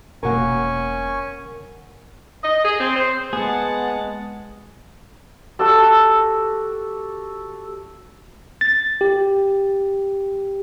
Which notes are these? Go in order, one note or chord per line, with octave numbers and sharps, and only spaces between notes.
E1 B2 A#3 C#4 A#4 F#5 G#5 C#6
D#5
G#4
C4
C5
G#3 B3 G#4 F#5 A5
F#4 G4 A4 E6
A6
G4